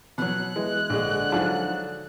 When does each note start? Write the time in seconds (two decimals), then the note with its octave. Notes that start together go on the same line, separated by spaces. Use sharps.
0.18 B2 F#3 F#6
0.56 E3 G#3
0.90 A#1 D3 G#3
1.32 G#2 F3 F#3